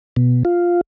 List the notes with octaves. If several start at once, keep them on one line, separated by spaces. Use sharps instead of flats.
B2
F4